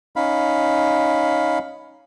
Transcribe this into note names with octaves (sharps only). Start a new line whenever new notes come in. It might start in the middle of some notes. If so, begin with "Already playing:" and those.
C#4 D#4 F5 B5